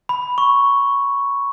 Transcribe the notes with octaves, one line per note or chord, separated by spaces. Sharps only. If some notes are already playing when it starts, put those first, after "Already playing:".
B5
C#6